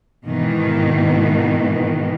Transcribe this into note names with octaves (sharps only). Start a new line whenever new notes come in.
G#2 B2 D#3 E3